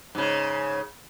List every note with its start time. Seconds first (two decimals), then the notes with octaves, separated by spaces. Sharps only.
0.15 G#2 C#3